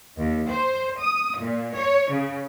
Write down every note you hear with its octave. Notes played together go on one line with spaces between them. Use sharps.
D#2
C5
D#6
A#2
C#5
C#3